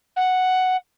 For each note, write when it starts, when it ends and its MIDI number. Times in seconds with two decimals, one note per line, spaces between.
0.16 0.76 78